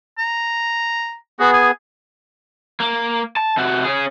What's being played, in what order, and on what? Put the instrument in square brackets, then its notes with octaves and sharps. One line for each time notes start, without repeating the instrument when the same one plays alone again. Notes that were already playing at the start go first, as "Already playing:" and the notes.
[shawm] A#5
[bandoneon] B3 G#4 [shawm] F#4
[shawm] G#5
[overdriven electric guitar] A#3
A5
C3 F#4
C#4 G#4